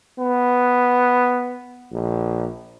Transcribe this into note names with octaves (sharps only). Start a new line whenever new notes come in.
B3
A#1